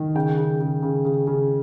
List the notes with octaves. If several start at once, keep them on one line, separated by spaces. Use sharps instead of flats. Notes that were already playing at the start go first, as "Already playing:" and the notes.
Already playing: D#3
C#3 G5
C#3
C#3
C#3
C#3
C#3